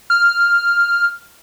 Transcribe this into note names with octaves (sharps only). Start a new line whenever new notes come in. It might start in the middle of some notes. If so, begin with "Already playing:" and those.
F6